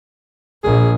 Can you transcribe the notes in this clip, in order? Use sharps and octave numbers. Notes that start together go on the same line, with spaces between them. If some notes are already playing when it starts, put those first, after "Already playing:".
A#1 G#4